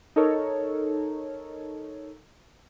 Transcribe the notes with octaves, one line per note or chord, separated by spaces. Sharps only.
D#4 A4 A#4 C#5